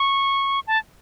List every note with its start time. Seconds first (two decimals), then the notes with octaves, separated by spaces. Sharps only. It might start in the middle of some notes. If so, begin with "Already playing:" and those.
Already playing: C#6
0.67 A5